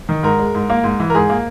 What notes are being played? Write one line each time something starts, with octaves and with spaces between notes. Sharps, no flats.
D#3
G#2 A#4
G#3
G#2
A#3
G#2
E3
A#4
G#2 G#4
A#3